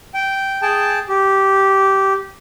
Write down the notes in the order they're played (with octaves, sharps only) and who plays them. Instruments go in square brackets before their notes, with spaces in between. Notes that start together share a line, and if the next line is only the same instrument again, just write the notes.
[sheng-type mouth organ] G5
G#4 G5 A5
G4